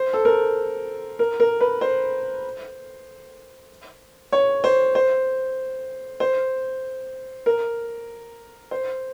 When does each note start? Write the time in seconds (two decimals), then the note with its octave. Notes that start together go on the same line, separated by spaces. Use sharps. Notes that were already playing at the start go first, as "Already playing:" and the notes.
Already playing: C5
0.13 A4
0.25 A#4
1.19 A#4
1.40 A#4
1.60 B4
1.81 C5
4.32 C#5
4.64 C5
4.95 C5
6.20 C5
7.46 A#4
8.71 C5